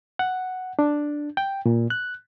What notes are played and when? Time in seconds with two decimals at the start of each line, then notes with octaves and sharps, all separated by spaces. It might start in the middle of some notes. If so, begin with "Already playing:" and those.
0.19 F#5
0.79 D4
1.37 G5
1.66 A#2
1.90 F#6